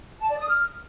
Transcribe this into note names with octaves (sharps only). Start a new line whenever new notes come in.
A5
D5
D#6
F6